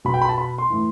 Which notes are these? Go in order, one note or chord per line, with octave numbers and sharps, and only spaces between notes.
B2 B5
G5
B5
A5
B5
C6
A2 E3